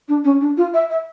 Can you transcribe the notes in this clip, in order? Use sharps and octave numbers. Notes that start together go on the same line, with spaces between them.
D4
C#4
D4
F4
E5
E5